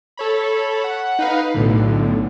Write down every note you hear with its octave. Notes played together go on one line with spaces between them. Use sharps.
A4 C#5 B5
F#5
D#4 B4 F5
B1 A2 D3